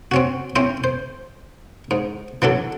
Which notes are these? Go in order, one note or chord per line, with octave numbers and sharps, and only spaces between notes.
C4 C#4 F#4
C4 C#4 E4 C5
C5
G#2
E3 F#3 D4 A4